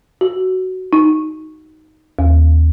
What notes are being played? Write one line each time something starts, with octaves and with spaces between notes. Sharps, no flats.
F#4
D#4
D#2